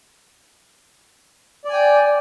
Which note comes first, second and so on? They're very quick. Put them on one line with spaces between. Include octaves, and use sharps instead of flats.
D5 G#5 G5